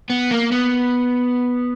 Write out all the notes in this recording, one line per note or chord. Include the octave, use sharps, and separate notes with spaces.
B3
A#3
B3